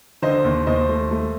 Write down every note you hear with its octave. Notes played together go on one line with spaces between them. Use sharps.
D3 C5 D#5
D#2
D#2 C5 D#5
A3
A3